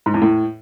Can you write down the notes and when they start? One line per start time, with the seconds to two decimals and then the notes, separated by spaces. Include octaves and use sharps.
0.06 G#2
0.14 E2
0.22 A2